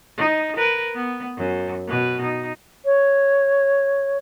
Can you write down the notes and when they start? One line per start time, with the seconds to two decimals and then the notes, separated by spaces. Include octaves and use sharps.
0.17 D#4
0.57 A#4 B4
0.94 B3
1.37 F#2
1.87 B2 B4
2.21 D#4
2.85 C#5